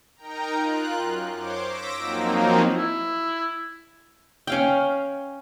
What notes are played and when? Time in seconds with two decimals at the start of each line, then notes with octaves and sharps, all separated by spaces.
0.16 D#4 A#4 G5 A#5
0.56 F4 F#6
0.97 F#2
1.34 C5 C#5 C6 D6
1.64 D6 E6 A#6 B6 D7
1.97 F3 F#3 A#3 C4 D#4
2.77 E4
4.47 C#4 F5 G5